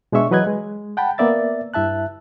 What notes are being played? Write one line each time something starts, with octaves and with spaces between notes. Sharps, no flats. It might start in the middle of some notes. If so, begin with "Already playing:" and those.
B2 G#3 D4 G#4 E5 C#6
E3 F#3 B4 D#5 F#6 G#6
G#3
F#5 G5 A5 B5
A#3 B3 D5 E5 A6
G2 E4 E5 A5 F#6